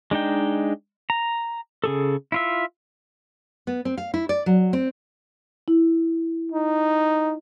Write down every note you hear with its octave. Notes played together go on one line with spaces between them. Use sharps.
G#3 D4 D#4 G5
A#5
C#3 G#4 A4
E4 F4 E5
B3
C4
F5
E4
D5
F#3
C4
E4
D#4